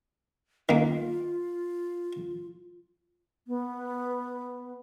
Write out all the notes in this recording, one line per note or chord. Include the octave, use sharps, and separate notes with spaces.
D#3 A#3 F4
B3